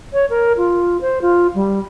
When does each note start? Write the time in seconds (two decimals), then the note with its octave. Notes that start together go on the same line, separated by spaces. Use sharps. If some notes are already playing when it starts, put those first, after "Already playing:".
0.13 C#5
0.30 A#4
0.57 F4
1.01 C5
1.22 F4
1.55 G3